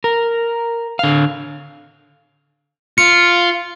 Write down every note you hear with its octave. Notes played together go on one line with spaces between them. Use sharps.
A#4
D3 F5
F4 C#7